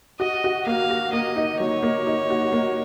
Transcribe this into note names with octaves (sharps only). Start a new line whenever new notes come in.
F#4 D#5
F#4
A#3 F5
F#4
A#3 D#5
D#4
F#3 C#5
A#3
D#4
F#4
A#3